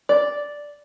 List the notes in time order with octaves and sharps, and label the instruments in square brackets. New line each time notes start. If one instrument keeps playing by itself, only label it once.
[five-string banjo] D5